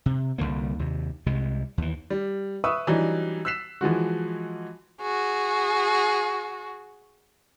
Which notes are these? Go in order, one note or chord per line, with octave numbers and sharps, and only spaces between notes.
C3
C2 F#2 D3 A#3
D#2 C3
C2 C3 G#3
D#2 E3
G3
B4 E5 C#6 D#6 E6
E3 F#3 G3 D4 D#4
E6 F#6 B6 C7 E7
E3 F3 G#3 F#4
F#4 G#4